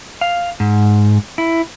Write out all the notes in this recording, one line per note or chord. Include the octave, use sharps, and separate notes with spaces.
F5
G#2
E4